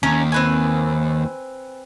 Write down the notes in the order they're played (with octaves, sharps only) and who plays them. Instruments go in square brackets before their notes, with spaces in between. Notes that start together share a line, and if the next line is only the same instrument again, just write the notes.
[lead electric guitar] D#2 [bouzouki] C#4 A#4
[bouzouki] C4 B4 G#5